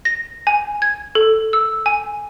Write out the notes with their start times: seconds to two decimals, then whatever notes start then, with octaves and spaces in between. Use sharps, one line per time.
0.05 A#6
0.47 G#5
0.82 G#6
1.15 A4
1.53 E6
1.86 G#5